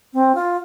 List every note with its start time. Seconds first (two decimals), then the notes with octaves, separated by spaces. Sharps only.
0.13 C4
0.35 F4